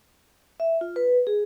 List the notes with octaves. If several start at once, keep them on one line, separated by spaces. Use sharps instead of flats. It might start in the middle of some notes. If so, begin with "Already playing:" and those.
E5
F4
B4
G#4